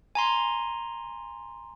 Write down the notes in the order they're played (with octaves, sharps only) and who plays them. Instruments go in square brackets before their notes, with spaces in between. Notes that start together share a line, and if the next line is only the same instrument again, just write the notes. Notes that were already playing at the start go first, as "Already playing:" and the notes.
[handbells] G#5 A#5 C6